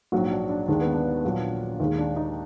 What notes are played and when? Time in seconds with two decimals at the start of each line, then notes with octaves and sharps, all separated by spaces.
0.12 A#1 G#2 F#3 F#4
0.31 D4
0.49 D4
0.68 D#2 D#3 G#3 D4
0.81 B3
0.93 D4
1.24 A#1 A#2 F#3
1.80 D#2 D#3 G#3
1.98 D4
2.16 D#4